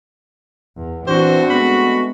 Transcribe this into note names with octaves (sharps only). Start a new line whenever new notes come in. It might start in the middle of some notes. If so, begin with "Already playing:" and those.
E2
E3 C4 D4 F#4 C5
G#3 A3 B3 B5